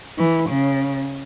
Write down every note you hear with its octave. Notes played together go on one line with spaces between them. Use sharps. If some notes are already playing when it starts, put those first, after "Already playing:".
E3
C#3